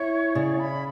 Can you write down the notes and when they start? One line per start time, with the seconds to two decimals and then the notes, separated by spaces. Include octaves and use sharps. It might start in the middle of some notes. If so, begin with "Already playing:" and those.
Already playing: E4 C#5
0.35 C#3 D5
0.58 B5